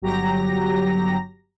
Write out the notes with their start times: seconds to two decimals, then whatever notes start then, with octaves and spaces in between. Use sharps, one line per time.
0.01 G1 F#3 G4 A#5 A#6